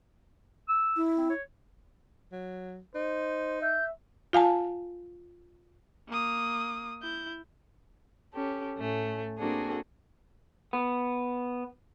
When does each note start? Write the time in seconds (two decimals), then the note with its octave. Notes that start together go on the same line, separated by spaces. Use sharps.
0.68 E6
0.96 E4
1.17 C4
1.29 C#5
2.32 F#3
2.95 D#4 C5
3.62 E5 G6
4.33 F4 F5 G#5 A5
6.08 A#3 D#6
7.01 E4 G6
8.32 C#4 G4 A4
8.77 A2 A3 C#4
9.38 A#3 C4 D4 F#4 G#4 A4
10.73 B3